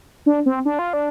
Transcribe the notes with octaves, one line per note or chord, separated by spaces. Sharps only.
D4
C4
D4
F4
D4